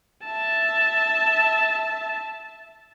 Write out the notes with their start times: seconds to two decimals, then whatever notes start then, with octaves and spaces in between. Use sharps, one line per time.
0.25 E5 A5